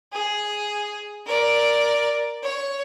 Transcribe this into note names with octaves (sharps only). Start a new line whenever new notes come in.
G#4
A#4 D5
C#5